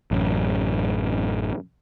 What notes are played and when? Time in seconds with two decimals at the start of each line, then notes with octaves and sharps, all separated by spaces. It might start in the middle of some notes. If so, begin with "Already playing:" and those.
0.11 A1 F#2